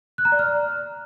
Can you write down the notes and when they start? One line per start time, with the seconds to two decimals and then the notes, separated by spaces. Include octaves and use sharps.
0.18 F#6
0.25 A#5
0.32 D5
0.39 F6